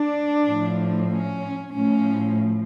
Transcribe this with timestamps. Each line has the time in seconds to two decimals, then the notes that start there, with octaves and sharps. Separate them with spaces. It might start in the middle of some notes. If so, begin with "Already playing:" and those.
Already playing: D4
0.43 A2 F3
1.08 C#4
1.72 A2 F3 C#4